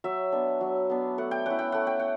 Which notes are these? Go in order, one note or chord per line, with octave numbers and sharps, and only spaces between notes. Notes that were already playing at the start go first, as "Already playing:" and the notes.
F#3 E5
B3 D4
F#3
B3 D4
A3 F#5
G5
C#4 E4 F#5
G5
A3 F#5
G5
F#5